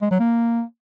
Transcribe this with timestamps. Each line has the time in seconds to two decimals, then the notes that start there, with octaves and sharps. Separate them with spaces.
0.02 G#3
0.11 F#3
0.20 A#3